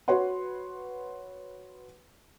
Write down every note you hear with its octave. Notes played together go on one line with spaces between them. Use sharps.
F#4 B4 C#5 F#5 C6